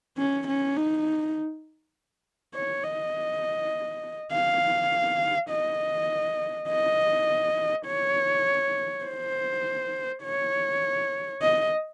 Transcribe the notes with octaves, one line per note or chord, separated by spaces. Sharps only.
C#4
C#4
D#4
C#5
D#5
F5
D#5
D#5
C#5
C5
C#5
D#5